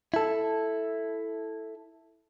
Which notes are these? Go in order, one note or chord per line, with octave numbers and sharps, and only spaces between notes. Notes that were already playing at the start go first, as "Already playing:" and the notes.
E4 A4